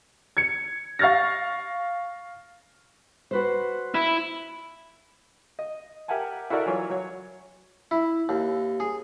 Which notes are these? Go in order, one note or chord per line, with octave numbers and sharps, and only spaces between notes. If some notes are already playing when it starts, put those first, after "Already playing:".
G#6 C#7
F5 C#6 F6 A6 A#6
F#4 B4 C5
E4
D#5
G4 A#4 E5 F#5 G#5 A5
E4 F#4 A4 A#4 D5 D#5
E3 F#3 F4 C#5
F#3 F#4 C#5
E4
D#2
G#4